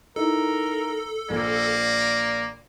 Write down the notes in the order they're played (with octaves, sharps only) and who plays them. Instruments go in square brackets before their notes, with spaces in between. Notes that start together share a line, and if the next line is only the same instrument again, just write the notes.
[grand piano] D#4 E4 [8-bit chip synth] A4 [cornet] A#4
[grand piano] A#1 [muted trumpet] A#3 [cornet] D5